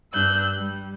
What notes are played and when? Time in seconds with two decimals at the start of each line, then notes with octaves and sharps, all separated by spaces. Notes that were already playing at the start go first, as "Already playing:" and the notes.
0.13 G2 D4 E6 F#6 G6
0.54 G3